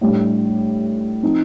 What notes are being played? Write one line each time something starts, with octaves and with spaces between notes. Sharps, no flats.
A2 G3 D4
F3 C4 D#4